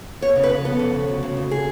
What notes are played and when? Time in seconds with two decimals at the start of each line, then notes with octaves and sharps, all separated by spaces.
0.21 B3 C#5
0.36 C#3
0.44 B4
0.50 F2
0.65 B3 A4
0.79 F2
0.94 C#3
1.08 D2
1.23 C#3
1.37 D2
1.51 G#4